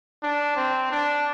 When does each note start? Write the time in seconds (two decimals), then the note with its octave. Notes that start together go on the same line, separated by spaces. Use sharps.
0.23 D4
0.56 C4
0.91 D4